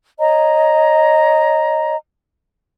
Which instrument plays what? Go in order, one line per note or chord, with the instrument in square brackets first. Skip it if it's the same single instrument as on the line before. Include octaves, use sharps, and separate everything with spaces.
[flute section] C#5 D#5 A#5